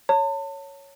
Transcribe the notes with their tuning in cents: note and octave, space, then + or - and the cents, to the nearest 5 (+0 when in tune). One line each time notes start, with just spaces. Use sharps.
C#5 +0 A5 +40